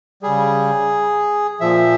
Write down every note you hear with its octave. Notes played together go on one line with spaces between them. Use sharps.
C#3 G3 G#4
A#2 F3 E5